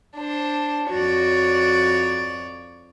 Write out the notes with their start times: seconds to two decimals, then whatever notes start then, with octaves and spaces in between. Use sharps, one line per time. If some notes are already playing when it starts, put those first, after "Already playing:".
0.17 D4 C5
0.90 F2 F#4 C#5 D5